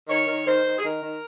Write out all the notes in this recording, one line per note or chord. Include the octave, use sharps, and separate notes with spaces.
D#3 C#5
D#3
D#3 C5
D#3
G#4
D#3 A#4
D#3